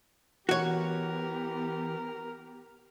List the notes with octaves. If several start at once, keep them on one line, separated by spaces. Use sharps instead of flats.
E3 B3 F#4 G4 A#4 C#5